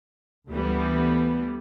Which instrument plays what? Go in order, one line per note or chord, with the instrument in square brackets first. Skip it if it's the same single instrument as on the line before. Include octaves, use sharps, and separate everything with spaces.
[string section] D2 E3 G3 B3